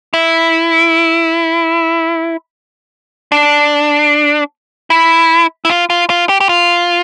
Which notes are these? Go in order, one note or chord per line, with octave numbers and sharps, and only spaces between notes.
E4
D4
E4
E4
F4
F4
F4
G4
G4
F4